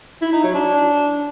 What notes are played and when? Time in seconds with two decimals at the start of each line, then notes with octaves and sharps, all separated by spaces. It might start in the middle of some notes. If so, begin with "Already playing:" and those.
0.22 E4
0.32 D#4
0.43 F#3
0.54 D4